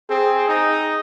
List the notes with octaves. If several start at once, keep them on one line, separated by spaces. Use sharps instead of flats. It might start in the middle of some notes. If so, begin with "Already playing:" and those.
C4 G#4
D#4